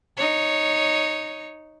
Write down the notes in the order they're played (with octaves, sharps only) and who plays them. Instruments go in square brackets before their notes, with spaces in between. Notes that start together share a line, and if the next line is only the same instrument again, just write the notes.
[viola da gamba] D#4 C#5